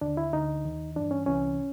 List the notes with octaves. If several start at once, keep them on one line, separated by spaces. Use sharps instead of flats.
D#2 D3 D4
E4
D2 D3 D#4
D#2 D#3
G2 E3 D4
C#4
C2 C3 E3 C#4